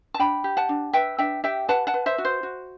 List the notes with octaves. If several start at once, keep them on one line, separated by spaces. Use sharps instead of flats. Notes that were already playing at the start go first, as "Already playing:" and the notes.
A5
D4 G5 B5
G4
F#5 A5
D4
B4 E5 G5
D4 E5 G5
G4 E5 G5
B4 F#5 A5
F#5 A5
B4
C5 E5
F#4
C5
F#4